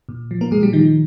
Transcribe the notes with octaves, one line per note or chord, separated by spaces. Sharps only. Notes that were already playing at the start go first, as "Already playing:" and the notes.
A#2
F3
A#3 A#4
A#2 G#3 G#4
G3 G4
D#3 F3 D#4